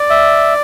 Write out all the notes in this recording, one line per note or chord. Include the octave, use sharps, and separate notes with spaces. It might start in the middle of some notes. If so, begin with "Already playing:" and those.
Already playing: D5
E5